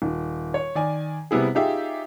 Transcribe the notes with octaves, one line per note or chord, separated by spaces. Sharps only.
D#1
C#5
D#3 D5 G#5
C3 G3 B3 E4 G#4
D#4 F4 G4 G#4 E5